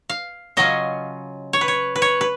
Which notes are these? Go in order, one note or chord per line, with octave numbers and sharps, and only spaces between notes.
F5
C#3 F#3 C#4 F4 D#5
C#5
B4
C#5
B4
C#5
B4